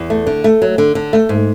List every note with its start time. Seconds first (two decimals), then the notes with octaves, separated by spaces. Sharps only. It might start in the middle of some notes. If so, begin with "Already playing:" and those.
Already playing: E2
0.10 A3
0.27 D3
0.44 A3
0.62 F#3
0.78 D3
0.95 D3
1.13 A3
1.29 G#2